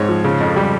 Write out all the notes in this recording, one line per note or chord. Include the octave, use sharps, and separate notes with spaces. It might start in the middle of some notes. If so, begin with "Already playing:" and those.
Already playing: G#2 G#3 C4 C#5
F3
C#3
F2
G3